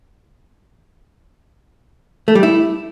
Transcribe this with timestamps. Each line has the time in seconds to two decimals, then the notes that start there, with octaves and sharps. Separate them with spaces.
2.28 A3
2.35 G3
2.43 E4